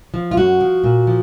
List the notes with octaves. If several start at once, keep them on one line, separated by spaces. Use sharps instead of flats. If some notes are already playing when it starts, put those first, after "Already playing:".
F3
F4
F#2 F#4
F3
A#2
F3